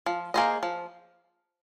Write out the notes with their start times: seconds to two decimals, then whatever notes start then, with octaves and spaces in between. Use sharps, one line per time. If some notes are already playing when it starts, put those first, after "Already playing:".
0.06 F3
0.34 A#3 G#4 C5 D#5
0.63 F3